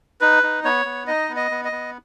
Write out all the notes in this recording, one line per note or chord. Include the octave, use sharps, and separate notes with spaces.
D#4 B4
D#4
B3 C#5
B3
D#4 D#5
B3
D#5
B3
D#5
B3